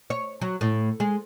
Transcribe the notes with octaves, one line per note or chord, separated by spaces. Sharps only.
C#5
F#3
A2
G#3